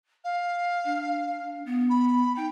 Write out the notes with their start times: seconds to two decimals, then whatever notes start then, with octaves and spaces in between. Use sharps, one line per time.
0.24 F5
0.85 D4
1.66 B3
1.90 B5
2.36 D#4 G5